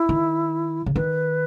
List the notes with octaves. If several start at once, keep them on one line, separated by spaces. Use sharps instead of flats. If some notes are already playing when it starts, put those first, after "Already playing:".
Already playing: E4
D#3
C#3
D#3 B4